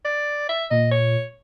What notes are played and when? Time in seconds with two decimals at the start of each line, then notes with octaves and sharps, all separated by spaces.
0.05 D5
0.49 E5
0.71 A#2 D#5
0.91 C#5